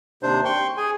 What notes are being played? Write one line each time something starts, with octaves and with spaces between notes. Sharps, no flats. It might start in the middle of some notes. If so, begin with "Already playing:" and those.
D#2 C3 D4 C5
G5 C6 C#6
G#4 G#5